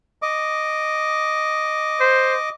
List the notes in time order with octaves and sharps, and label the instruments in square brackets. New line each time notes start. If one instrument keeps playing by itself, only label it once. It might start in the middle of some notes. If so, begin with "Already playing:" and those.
[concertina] D#5 D6
[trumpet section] C5